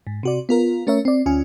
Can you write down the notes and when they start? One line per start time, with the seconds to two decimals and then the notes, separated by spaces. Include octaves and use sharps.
0.07 G#2
0.23 C3 F#4 D5
0.49 B3 F4 A#4
0.87 A3 C#4 A#4 C#5 E5
1.05 C4 D5
1.26 D2 C#4 F4 G#5